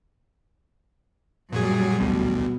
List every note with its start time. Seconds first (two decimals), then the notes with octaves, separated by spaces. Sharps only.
1.52 F#2 A#2 F#3 G3 G#4
2.00 A1 D2 B2